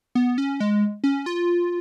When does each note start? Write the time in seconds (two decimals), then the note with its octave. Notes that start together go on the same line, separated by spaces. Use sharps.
0.15 B3
0.38 C#4
0.60 G#3
1.04 C#4
1.26 F4